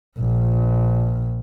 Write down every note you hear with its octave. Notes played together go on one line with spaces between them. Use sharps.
A#1